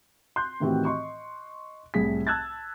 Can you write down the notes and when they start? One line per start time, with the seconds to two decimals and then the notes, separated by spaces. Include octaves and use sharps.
0.36 C6 F#6 G6
0.60 A2 D#3 E3 C4 F#4 G4
0.85 D#5 C6 C#6
1.94 C2 A2 G#4 B6
2.27 A5 E6 F#6 G#6 A6